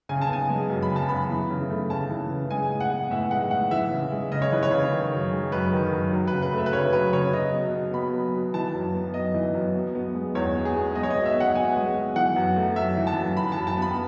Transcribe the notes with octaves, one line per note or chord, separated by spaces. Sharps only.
C#3 G#5
A5
B3 G#5
G#3
F#2
B5
C#3
A5
B3 B5
E3
C#3
A3
C#3 A5
E3
C#3
G#3 G#5
A2
F#5
B3
A2 E5
G#3 F#5
A2 F#5
E3 E5
C#3
G#3
C#3 D#5
C#5
E3 B4
C#5
C#3
D#3
F#2
G#3
F#2 B4
D#3
F#2
F#3
C#3 B4
B4
A3 E5
B4
C#3 C#5
F#3 B4
C#3 C#5
F#3 D#5
B2
B3
B2 B5
F#3
B2
E3 A5
F#2
B3
F#2 D#5
E3
F#2
B2
B3
G#3
E2 C#5
B2
G#4
B3
G#3 D#5
C#5
B2 D#5
E5
B3
F#5
B2 G#5
G#3
B2
E3 F#5
F#2
A3
F#2 E5
E3
A5
F#2
E3 B5
F#2 A5
A5
B3
B5